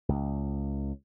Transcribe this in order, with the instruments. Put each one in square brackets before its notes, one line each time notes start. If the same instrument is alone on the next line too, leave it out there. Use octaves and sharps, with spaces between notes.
[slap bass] C#2